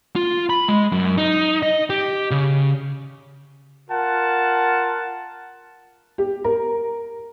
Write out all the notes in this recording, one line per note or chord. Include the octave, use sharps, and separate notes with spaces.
F4
B5
G#3
F#2
D#4
D#5
G4
C#3
F4 A#4 F#5 A5
G4
A#4